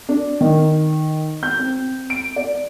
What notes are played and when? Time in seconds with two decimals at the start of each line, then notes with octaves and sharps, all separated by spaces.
0.09 D4
0.41 D#3
1.43 G6
1.59 C4
2.10 D7
2.36 D5